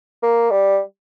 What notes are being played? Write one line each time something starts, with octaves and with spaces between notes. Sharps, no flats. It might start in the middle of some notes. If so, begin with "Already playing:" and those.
A#3
G3